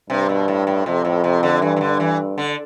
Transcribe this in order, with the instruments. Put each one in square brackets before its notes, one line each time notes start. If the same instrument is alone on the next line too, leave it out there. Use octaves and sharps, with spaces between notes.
[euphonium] G2 [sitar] C3
[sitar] B2
A2
A2
[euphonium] F2 [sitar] C3
[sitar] A2
C3
D3
[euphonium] G2 [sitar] E3
[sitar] E3
D3
E3
D3